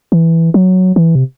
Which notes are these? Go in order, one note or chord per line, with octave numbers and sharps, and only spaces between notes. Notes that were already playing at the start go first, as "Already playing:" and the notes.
E3
F#3
E3
C3